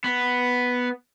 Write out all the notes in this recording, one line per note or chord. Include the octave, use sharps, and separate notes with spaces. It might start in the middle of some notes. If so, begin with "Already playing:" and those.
B3